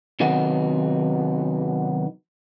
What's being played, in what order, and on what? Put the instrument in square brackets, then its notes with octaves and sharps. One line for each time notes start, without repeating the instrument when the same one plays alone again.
[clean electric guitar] C3 D#3 F#3 B3 D#4 F#4